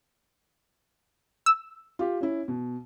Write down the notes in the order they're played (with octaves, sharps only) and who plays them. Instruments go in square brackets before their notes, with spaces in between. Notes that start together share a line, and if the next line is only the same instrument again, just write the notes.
[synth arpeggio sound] E6
[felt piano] F4 G4
C#4 E4
B2